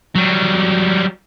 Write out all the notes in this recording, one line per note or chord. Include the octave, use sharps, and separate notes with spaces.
F#3 G3